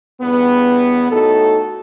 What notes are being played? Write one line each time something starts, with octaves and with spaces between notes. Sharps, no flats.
E2 G2 B3
A2 D#4 F#4 A4